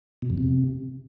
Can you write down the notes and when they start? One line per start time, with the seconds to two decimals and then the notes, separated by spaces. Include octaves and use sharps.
0.22 B2
0.30 F2
0.38 C3